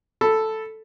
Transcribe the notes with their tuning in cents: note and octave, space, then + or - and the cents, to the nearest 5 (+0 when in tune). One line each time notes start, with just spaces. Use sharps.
A4 +0 B5 +0